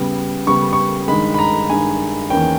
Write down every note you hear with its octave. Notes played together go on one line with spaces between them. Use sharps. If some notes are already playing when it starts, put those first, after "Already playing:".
Already playing: C#3 G3 B3
C#3 G3 B3 C#6
C#6
G2 D#3 G#3 B5
B5
A#5
G2 D#3 G#3 G#5
E2 D#3 A#3 C#4 G5